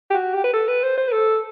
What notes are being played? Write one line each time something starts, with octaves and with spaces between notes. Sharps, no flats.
G4
F#4
G4
B4
A4
B4
C5
C5
B4
A4